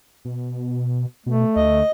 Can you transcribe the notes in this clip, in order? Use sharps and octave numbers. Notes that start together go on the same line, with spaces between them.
B2
B2 A3
D2 D#5